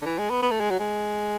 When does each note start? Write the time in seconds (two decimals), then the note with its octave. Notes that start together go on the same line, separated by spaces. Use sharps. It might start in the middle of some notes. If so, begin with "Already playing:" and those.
0.02 D3
0.05 E3
0.18 G#3
0.30 B3
0.42 B3
0.51 A3
0.60 G#3
0.70 F#3
0.79 G#3